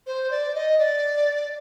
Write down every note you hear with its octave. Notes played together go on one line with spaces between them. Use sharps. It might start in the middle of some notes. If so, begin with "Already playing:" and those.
C5
D5
D#5
D5